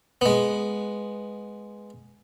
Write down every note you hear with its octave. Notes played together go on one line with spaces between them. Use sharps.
G#3 B3